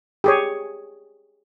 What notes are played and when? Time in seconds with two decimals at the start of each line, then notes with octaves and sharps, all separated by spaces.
0.24 G4 G#4 C#5